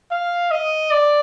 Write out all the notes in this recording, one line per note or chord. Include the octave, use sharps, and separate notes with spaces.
F5
D#5
D5